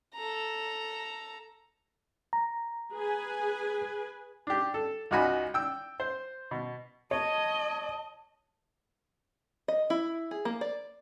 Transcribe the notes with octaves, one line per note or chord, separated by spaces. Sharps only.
A4 A#5
A#5
G#4 B4 G#5
D4 G4
A4
C#2 D#4 F#4 G#5 B5
G5 E6
C5
B2
C#5 D#5 A5
D#5
E4
G#4
A#3
D5